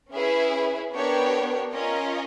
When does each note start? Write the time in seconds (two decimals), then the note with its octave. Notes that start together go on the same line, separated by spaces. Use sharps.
0.12 C#4 E4 G#4 B4 E5
0.92 B3 D4 G4 A#4 C#5
1.72 C#4 F4 A#4 D#5